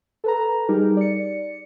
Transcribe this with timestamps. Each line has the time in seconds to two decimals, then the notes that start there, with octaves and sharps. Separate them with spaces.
0.24 A4 B4 A#5
0.69 G3 D#4 G4 G#4 A#4
0.97 D5 C#7